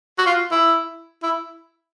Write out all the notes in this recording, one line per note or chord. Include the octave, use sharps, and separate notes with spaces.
F#4
F4
E4
E4